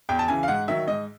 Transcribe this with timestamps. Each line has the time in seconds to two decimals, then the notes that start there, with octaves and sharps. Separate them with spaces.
0.09 E2 G5
0.19 A5
0.28 C#3 E3 G#5
0.43 F5
0.48 G#2 F#5
0.68 D#3 F#3 E5
0.87 G#2 D#5